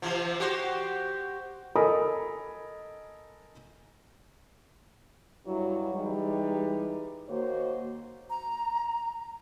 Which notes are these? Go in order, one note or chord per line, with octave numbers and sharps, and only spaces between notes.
C3 E3 F3
F#4 G4 C5
A4 A#4 D#5 G#5 B5 D#6
G2 F#3 E4
E3 G3 G#3 D#4 G4 B4
D#2 D#3 A#3 F#4 C5 C#5
A#5